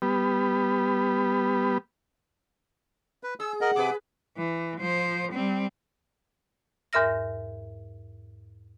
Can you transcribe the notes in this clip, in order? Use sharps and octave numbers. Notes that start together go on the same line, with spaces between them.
G3 B3
B4
G#4 E6
A#4 D#5 F#5
C3 G#4 B4 D6
E3
F3 C5
G3 C4
E2 G#2 A#4 E5 F6 A#6